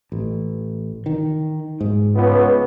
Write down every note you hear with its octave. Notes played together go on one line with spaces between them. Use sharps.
A1
D#3
G#2
C#2 B3